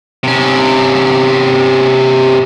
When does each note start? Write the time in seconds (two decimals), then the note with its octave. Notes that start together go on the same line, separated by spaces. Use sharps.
0.23 C3 C#4